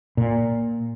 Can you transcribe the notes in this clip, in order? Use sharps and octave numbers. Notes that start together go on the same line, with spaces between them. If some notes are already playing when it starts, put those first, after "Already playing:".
A#2